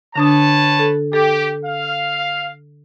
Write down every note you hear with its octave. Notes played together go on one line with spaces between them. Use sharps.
D3 D4 B4 C#5 A5 D#6
A4
G4 A4
F5